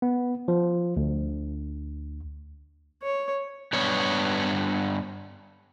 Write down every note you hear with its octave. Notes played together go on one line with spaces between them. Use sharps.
B3
F3
D2
C#5
G2 B3 C#5